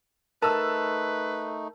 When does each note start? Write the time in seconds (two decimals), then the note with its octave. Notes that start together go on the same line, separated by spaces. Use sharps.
0.42 A3 D#4 A#4 B4 A5 E6